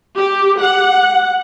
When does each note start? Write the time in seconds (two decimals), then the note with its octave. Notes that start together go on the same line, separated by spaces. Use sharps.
0.16 G4
0.62 F#5